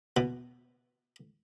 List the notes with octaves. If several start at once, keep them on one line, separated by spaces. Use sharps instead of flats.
B2